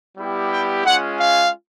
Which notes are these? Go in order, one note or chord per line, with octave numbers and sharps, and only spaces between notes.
G3 B3 E4 G4
G5
G#3 C#4 F4 F#5
F5